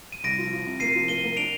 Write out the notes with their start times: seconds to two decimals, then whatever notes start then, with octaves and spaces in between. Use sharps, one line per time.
0.12 D#7
0.24 C2 A#6 D7
0.38 F3
0.53 F3
0.67 C3
0.80 A#3 C7 D#7
0.95 F3
1.08 A#3 D#7 G7
1.23 A#3
1.37 D4 D7 F7